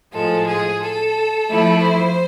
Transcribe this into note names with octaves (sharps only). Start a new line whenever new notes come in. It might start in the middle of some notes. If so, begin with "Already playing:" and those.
A2 F3 G#3 A4
G#4
A4
F3 A3 E4
C5